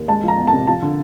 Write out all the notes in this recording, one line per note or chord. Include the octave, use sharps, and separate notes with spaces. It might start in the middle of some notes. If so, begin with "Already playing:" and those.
Already playing: D#2
G#3 A5
F3 A#5
E2
A5
C3
F3 A5
D3